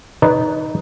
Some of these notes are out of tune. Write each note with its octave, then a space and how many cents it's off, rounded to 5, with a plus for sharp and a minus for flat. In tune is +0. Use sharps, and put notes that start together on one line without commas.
D#4 +0 B4 +0 D5 -30